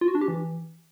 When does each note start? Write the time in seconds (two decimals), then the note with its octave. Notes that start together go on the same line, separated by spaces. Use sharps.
0.01 F4
0.08 F#4
0.15 D4
0.21 G4
0.28 E3